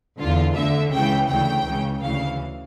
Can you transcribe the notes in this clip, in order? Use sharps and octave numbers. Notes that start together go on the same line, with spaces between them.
E2 D3 F4
D2 D3 E5
C#2 C#3 E3 G5
D2 C#3 E3 G5
C#2 C#3 E3
D2 C#3 E3 F5